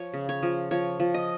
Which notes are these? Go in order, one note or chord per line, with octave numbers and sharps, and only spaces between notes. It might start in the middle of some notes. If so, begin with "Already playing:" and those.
Already playing: F3 C#5
C#3
C#5
F3
F3 C#5
F3
D#5